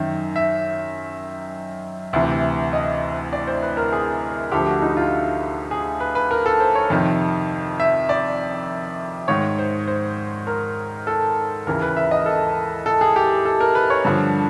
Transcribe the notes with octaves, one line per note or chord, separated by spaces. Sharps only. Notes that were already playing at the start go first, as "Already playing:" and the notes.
Already playing: F#2 D#3 E5
E5
D2 C3 E3
D#5
D5
C5
B4
A#4
G#4
D2 D3 F3 G4
F#4
D#4
F4
G#4
B4
B4
A#4
A4
C5
C#5
F2 C3 D#3
E5
D5
G#2 D#3 C#5
C5
C5
A#4
A4
D#2 C#3 E3 A#4
B4
E5
D#5
A4
A4
G#4
G4
A4
A#4
B4
C#5
G2 D3 F3